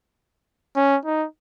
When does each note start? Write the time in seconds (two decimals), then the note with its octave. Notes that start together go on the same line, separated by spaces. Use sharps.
0.76 C#4
1.05 D#4